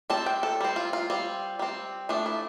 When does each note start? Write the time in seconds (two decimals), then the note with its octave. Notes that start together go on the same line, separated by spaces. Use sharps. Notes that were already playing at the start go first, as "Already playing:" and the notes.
0.10 G3 C4 A5
0.26 G5
0.43 A4
0.61 G3 C4
0.76 F4
0.93 F4
1.10 G3 C4
1.59 G3 C4
2.09 F3 A3 D4
2.26 E4